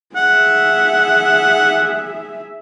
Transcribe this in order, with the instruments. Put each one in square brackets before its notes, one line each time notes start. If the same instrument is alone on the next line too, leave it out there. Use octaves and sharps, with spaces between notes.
[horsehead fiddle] G#4 E5 [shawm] F#5